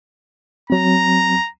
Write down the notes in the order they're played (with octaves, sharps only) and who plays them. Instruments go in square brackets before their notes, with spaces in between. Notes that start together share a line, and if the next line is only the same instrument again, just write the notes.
[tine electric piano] F#3 C4 [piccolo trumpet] A#5